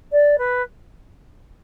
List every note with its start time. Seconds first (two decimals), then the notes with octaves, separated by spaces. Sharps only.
0.12 D5
0.38 B4